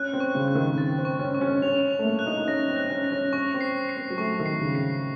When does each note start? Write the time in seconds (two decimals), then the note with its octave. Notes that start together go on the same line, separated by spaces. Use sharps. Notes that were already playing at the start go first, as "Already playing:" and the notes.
Already playing: C#4 F#6
0.13 C4
0.20 C#6
0.35 C#3
0.48 F#6
0.55 D#3
0.77 C4 A6
0.99 C4
1.05 C#6
1.19 C#4
1.35 C#6
1.41 C#4
1.62 C#4 F7
1.91 F7
1.99 A3
2.04 A#3
2.19 F#6
2.27 D#4
2.37 D#4
2.47 C#4 A#6
2.68 C4
2.76 F#6
2.90 C#4
3.04 A#6
3.12 C#4
3.32 C#4 C#6
3.54 C4
3.61 C7
3.89 C7
3.97 C4
4.10 F#3
4.17 A3 C#6
4.40 D#3
4.46 C7
4.61 C#3
4.75 C7